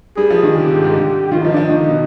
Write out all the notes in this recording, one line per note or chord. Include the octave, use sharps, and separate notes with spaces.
G3 G#4
F3
D#3
D3 G4
C3
G#2
G#2
D3
D#3 F4
F3 D#4
F3 D4
D#4
D#3
D3
B2